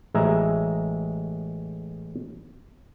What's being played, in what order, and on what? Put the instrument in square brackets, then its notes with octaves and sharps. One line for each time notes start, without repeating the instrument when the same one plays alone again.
[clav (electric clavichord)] A1 G#3 E5 A#5